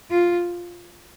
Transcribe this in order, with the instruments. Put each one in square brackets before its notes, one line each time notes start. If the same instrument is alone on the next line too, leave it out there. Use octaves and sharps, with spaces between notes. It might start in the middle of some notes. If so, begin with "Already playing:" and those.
[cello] F4